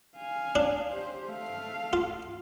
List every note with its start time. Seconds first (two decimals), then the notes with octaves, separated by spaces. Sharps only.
0.17 F5 G#5
0.55 D4
0.92 G4 C5
1.27 A3 F5
1.93 F4